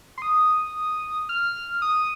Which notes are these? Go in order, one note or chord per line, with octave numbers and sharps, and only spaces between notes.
C6
D#6
F6
D#6